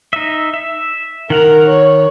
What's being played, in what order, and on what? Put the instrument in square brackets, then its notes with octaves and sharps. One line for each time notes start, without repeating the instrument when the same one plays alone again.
[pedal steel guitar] D#4 E5
E5
[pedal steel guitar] D#3 F#5 A#5 [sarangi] A#4
[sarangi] C#5